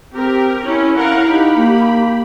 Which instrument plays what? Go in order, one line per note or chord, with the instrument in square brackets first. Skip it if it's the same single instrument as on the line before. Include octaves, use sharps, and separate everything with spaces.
[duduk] C4 [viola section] G4 A#4
[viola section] C#4 [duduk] E4
[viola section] A#4 F5 F#5
[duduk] D#4 [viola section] G4 B5
[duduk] A#3